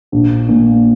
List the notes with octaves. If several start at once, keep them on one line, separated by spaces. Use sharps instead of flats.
A#1
A#2